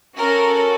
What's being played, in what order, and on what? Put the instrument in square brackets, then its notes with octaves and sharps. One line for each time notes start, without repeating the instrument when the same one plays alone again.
[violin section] C#4 F#4 A4 A#4